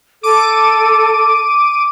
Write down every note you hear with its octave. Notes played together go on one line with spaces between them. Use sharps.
A4 D6 D#7